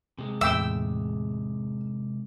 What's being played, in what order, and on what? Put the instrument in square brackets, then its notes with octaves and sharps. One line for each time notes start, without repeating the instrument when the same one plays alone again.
[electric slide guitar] C3 G#3
[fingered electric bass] E2 A2 [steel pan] E5 G5 [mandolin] E6